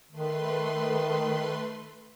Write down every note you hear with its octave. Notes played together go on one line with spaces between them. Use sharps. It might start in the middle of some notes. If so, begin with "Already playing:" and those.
D#3 A3 B4 C6